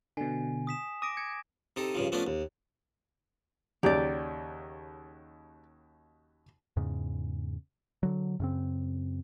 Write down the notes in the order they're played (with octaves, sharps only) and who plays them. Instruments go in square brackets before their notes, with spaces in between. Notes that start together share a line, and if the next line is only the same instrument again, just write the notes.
[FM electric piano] B2 D3 [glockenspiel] G#5
[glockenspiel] D#6 B6 E7
[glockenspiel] D6 A#6 D7 [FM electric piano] D#6
[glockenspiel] G#6 [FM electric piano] C#7
[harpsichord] C3 D#4 A4
G2 C#3 F3
F3 A3 B3 C#4 D4
D#2
[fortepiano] D#2 C#3 F#3 [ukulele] G4 D5
[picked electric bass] E2 G#2 C#3
D3 F#3
F#2 C#3 C4